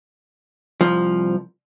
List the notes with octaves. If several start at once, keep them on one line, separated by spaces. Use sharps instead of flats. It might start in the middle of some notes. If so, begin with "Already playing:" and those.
C2 F3